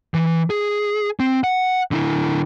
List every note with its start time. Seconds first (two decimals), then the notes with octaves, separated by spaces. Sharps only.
0.14 E3
0.50 G#4
1.20 C4
1.44 F#5
1.91 D3 E4